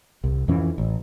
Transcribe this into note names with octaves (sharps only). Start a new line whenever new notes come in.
C2
F2 E3 C#4
A1